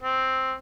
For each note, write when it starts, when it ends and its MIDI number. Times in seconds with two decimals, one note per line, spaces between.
0.02 0.55 60